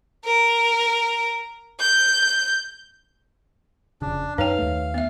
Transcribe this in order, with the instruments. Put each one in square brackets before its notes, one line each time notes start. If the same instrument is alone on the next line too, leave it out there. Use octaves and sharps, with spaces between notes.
[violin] A#4
G6
[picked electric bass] F1 C#3 [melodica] D4
[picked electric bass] F#2 [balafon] D#4 G5 [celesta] B4 C#5 F7 [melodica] F5
[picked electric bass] D#2 A3
[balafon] B3 E5